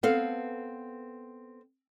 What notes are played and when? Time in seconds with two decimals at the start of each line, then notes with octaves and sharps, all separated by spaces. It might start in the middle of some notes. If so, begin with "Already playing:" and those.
0.03 B3 C4 A4 F5